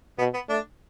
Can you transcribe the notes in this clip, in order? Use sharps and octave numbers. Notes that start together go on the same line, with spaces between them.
B2 B3
B3
A3 D4